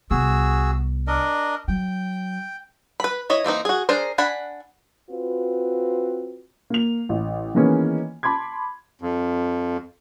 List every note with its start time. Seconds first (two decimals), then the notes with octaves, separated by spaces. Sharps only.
0.11 C2 B3 F#4 G#4 E6
1.07 D4 A#4 D#5
1.68 F#3 G5
3.00 B4 B5
3.30 E4 C#5 D#5
3.44 E3 A#3 C4 D#4
3.65 F#4 G#4
3.89 D4 G#4 A#4 C5
4.18 D4 F#5 G#5 B5
5.10 C4 F4 F#4 B4
6.70 A#3 F7
7.09 A1
7.55 D#3 E3 G#3 A#3 B3 C#4
8.23 A5 B5 C6 D6 G#6
9.02 F2